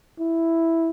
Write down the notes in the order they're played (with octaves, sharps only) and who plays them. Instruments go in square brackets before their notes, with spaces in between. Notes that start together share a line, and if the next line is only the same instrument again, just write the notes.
[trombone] E4